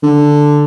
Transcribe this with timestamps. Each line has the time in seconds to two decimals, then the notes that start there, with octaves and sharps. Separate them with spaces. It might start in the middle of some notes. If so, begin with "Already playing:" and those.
0.03 D3